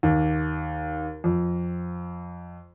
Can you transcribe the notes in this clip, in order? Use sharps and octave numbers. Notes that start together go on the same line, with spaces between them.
D#2
F2